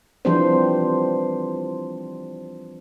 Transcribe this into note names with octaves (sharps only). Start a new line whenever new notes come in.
E3 F3 G3 C4 D4 C5